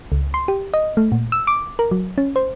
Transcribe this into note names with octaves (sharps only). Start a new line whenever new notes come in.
C#2
C6
G4
D#5
A3
A#2
E6
D6
A#4
F#3
C#4
C5